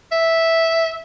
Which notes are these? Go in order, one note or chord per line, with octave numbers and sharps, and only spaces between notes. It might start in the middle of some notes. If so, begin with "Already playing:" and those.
E5